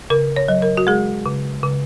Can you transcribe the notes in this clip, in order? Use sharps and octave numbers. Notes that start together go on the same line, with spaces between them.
C#3 A#4
C#5
F#3
A#4
F#4
G#3 G#4
C#3
C#3